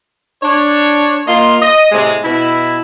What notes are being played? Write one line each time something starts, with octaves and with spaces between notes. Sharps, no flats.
D4 C#5
A#3 F4 D#5 C6
D#5
A2 C3 G#3
B2 E4